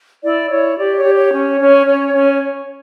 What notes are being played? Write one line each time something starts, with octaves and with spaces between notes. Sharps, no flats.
E4 D5
E4 C#5
G4 D5
C#5
G4
C#5
C#4
C#4
C#4
C#4